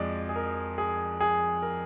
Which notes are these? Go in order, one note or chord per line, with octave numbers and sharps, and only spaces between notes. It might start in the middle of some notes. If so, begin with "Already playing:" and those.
Already playing: F2 F3 G#3 D5 D#5
G#4
A#4
G#4
G#4
A#4